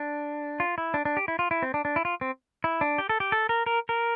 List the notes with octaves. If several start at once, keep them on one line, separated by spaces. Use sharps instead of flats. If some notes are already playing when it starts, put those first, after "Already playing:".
Already playing: D4
F4
E4
D4
D4
G4
E4
F4
E4
C4
D4
D4
E4
F4
C4
E4
D4
G4
A4
G4
A4
A#4
A#4
A#4